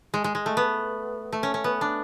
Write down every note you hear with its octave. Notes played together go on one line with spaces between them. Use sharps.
G#3
G#3
G#3
A3
B3
A3
C#4
C#4
B3
D4